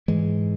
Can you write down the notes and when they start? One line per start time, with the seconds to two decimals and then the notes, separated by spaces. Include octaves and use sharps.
0.08 G#2 E3 G#3